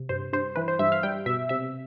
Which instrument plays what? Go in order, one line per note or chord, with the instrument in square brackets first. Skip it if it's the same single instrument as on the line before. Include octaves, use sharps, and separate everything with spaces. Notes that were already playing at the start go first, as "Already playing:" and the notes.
Already playing: [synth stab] C3
G2 C5
G2 C5
E3 B4
C5
G2 E5
F5
G3 G5
B2 E5
C3 E5